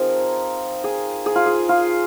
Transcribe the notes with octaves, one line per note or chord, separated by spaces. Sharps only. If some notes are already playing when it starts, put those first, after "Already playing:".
Already playing: F3 C4 D#4 G#4 A#4
G#4
G#4
F4
G#4
F4